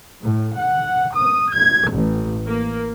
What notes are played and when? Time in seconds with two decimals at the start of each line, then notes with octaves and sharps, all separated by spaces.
0.20 A2
0.56 F#5
1.15 D#6
1.53 G#6
1.89 A1
2.47 A#3